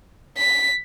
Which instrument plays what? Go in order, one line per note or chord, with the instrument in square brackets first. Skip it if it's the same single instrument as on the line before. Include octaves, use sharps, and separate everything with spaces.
[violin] B6